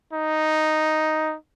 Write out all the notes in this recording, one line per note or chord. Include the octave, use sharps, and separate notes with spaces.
D#4